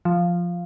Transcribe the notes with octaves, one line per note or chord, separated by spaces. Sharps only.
F3